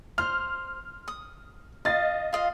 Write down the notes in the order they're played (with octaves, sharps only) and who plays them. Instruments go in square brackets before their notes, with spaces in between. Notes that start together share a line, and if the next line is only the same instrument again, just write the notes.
[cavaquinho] C5 [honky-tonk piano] F6
[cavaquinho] D#6
[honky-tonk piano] D#5 A6 [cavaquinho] F5
[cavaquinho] F4 D#5 F5